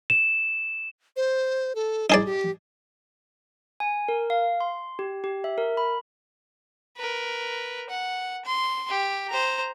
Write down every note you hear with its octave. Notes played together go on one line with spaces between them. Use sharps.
E7
C5
A4
D#4 E4 G#4 D5
G4
G#5
A#4
F5
C6
G4
G4
E5
A#4
B5
A#4 B4
F#5
C6
G4
C5 A#5